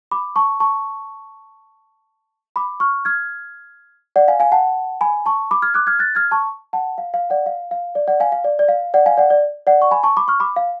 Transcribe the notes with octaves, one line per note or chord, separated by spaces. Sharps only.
B5 D6
A5 C#6
A5 C#6
B5 D6
C#6 F6
F6 G#6
D5 F#5
F5 G#5
F5 G#5
F#5 A5
G#5 B5
A5 C#6
B5 D6
F6 G#6
D6 F#6
F6 G#6
F#6 A6
F6 G#6
A5 C#6
F#5 A5
F5
F5
D5 F#5
F5
F5
D5
D5 F#5
F5 G#5
F5
D5
D5
F5
D5 F#5
F5 G#5
D5 F#5
D5
D5 F#5
C#6
G#5 B5
A5 C#6
B5 D6
C#6 F6
B5 D6
F5